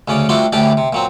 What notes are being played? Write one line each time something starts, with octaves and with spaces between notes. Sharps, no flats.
D2 C#3 C#4 D5
G3 A3 C4 D4 F4 F#4
D2 A2 E3 D4 G4 D5
C3
A#2 F#3 C4